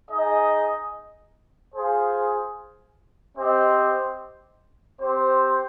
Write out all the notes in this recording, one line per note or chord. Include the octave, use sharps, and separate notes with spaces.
D#4 G#4 D#5
F4 G#4 C5
C4 G4 C5 D#5
C4 G4 C5